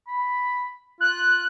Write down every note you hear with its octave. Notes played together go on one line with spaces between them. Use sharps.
B5
F4 F#6